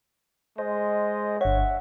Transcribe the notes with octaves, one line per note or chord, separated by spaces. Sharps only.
G#3 C5 D#5
G1 C#5 E5 F#5